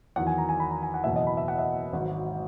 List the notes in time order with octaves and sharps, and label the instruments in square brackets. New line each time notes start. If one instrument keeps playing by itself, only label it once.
[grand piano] E2 D#3 F#3 F#5
G#5
A#5
G#5
B5
A#5
G#5
F#5
F#1 E2 B2 E5
D#5
B5
E5
F#5
E5
G#1 G#2 F#3